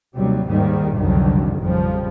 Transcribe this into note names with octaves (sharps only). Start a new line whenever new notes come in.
D#2 C3 F#3 G3
D#2 G#2 D#3 G3
C2 F2 D3 D#3 F#3 G3
A1 F2 C#3 F3 G3